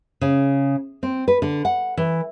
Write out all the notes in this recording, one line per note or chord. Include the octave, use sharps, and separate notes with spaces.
C#3
C4
B4
D3
F#5
E3